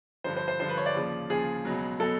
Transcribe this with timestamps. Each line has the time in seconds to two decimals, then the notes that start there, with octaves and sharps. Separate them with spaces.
0.24 G2 D3 F3 C5
0.37 C5
0.48 C5
0.60 G2 D3 F3 C5
0.69 B4
0.77 C#5
0.86 D5
0.95 D#2 C#3 F3
1.30 D#2 C#3 F3 G#4
1.65 C#2 B2 F#3
2.00 B2 F#3 A4